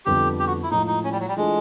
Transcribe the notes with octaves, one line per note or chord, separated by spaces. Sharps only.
F2 D3 G3 B3 G4
G4
F#4
E4
A2 F3 G#3 D#4
D#4
C#4
G3
F#3
G3
E3 G#3 A3 D4 F4